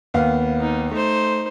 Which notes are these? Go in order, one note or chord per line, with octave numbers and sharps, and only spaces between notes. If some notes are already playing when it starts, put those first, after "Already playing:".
D#2 B3 F5
D#4
A3 D#4 C5